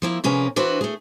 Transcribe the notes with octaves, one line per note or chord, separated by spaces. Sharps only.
F3 A#3 E4
C3 F3 C#4 G#4 A#4 B4
E3 D4 F#4 B4 C5
A3 G#4